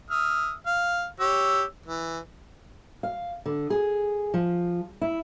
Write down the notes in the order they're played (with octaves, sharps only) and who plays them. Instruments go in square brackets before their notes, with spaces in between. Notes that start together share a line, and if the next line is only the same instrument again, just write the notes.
[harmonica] E5 D#6 F6
F5
G4 C#5 E6
E3
[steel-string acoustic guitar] F5
D3
G#4
F3
E4